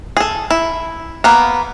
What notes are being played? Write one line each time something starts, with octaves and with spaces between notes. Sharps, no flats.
G#4 A4
E4
A#3 B3